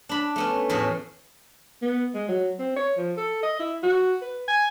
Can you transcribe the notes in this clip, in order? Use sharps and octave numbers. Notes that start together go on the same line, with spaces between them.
D4 B5
A3 B3 C#4
E2 A2 A3 F#4 G#4
B3
G#3
F#3
C4
C#5
F3
A4
D#5
E4
F#4
B4
G#5